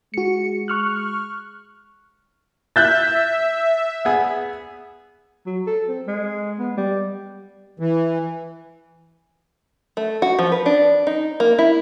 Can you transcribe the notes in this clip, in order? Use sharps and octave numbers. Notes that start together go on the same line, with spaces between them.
G#3 F#4 C#7
C#6 F6 F#6
E5 F#6 G6 A6
B3 G#4
F#3
A4
C4
G#3
B3
G3
E3
A3
F#4
F3
B4
D4
D#4
A#3
E4